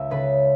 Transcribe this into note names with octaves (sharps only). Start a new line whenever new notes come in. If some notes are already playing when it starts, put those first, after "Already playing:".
Already playing: C#2 E5
C#3 A4 B4